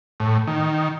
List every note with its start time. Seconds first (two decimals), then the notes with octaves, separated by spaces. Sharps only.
0.20 A2
0.47 D#3